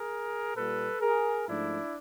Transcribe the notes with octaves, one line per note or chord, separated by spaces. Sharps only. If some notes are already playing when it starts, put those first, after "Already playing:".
Already playing: G#4 A#4
A#2 G3 A#3 A4 B4
G#4 A#4
G#2 F3 A3 D4 E4